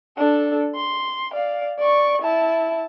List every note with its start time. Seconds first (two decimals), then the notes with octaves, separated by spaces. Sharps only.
0.18 D4 A4
0.75 C6
1.33 D5 F5
1.79 D5 C#6
2.22 E4 A5